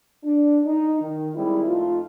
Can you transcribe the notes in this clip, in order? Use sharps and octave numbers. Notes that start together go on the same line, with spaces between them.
D4
D#4
D#3
D#3 G3 G#3 C4 E4
F2 A3 D#4 F4